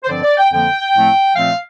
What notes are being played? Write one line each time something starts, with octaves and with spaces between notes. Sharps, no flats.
C5
G2 D3 F3 C4 D5
D5
G5
F2 D3 F3 A#3 G5
A2 F3 A3 C4
A#2 F3 A3 C4 F5